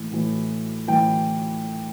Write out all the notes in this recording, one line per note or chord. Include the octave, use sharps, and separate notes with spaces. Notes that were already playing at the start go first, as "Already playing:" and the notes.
Already playing: A2 E3
A2 E3
A2 E3 G5